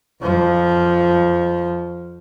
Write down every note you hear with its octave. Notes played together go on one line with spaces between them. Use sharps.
F2 F3